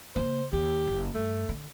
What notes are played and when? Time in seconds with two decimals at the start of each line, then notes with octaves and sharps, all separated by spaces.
0.16 C#3 A#3 C5
0.53 D#2 G4
0.87 F#1
1.15 G2 A3
1.49 D3